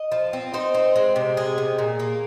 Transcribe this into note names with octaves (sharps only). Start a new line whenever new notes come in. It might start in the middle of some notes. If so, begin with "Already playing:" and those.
Already playing: D#5
F3
C4
D#4 C5
C4
G#3
C3
G#3 G#4
C3
A#2
A#3